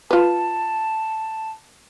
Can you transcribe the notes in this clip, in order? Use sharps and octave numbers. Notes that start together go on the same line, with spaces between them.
F4 B4 A5